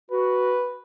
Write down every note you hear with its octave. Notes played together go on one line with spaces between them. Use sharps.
F#4 B4